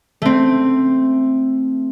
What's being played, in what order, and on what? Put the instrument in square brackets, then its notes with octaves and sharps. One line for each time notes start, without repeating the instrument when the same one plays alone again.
[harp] A3 C4